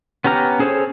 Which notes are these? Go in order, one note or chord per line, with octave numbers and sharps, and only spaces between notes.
B3 C#4 G4 A#5 F6
C#4 G#4 A4 C5 C#5